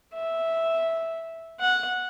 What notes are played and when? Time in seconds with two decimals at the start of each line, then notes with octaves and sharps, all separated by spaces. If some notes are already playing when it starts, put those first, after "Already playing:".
0.14 E5
1.60 F#5